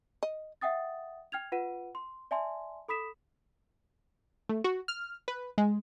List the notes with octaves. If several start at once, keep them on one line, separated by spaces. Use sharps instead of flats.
D#5
E5 F#5 G5 D#6 A6
G5 F6 G#6 F7
F4 B4 F#5 D#7
C6
D5 E5 G#5 A5 C6
A4 B5 D#6 B6 E7
A3
F#4
F6
B4
G#3